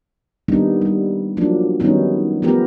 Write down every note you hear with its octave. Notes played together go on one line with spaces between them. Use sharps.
D#3 G3 A#3 B3 D4 D#4
G3
F3 F#3 A#3 D4
D#3 F#3 G3 B3 C#4 D#4
F3 A3 B3 G4 A#4